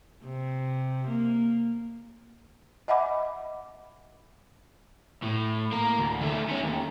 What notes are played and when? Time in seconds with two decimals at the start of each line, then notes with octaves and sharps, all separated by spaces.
0.23 C3
1.08 A#3
2.88 D#5 E5 F#5 G#5 B5 D6
5.22 A2
5.72 A#3 A#4
5.98 D2
6.21 D#3 A3
6.49 A3 C#4
6.63 D#2